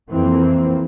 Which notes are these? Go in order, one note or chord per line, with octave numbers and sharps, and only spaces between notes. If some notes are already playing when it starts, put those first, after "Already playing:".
F2 E3 A#3 C4